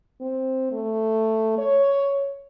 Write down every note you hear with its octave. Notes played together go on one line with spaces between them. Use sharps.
C4
A3
C#5